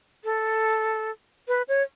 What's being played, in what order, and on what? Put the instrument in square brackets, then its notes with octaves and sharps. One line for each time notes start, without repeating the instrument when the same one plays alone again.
[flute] A4
B4
C#5